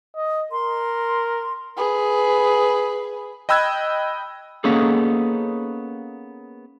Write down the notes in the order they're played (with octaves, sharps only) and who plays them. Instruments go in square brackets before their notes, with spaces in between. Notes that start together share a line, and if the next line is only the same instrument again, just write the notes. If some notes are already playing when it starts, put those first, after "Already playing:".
[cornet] D#5
[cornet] A#4 [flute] C6
[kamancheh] G#4 B4
[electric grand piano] D#5 G5 B5 E6 F#6 G#6
[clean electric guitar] A#3 B3 C#4 D#4 G#4 A4